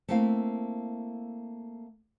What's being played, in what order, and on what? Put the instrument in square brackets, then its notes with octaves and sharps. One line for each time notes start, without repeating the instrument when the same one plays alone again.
[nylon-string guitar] A3 A#3 C4 E4 F5